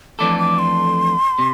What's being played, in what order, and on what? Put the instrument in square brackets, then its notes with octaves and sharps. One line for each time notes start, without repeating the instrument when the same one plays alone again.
[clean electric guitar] F2 E3 A3 D4 A4 [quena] D6
[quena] D6
C6
[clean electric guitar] C3